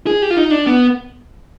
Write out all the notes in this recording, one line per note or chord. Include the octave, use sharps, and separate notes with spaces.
G#4
G4
F4
D#4
D4
B3